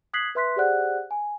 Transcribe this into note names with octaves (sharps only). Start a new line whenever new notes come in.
D#6 F#6 G#6 B6 C7 F#7
B4 E5 C6 F#6 B6
G4 G#4 C5 D5 F#5 F#6
G#5